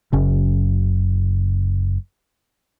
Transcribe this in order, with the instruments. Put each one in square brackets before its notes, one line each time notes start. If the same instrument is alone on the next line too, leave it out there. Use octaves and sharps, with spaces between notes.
[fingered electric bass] F#1 F#2 C#3